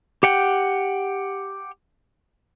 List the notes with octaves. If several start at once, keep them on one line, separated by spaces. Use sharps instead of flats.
G4 F#5 G5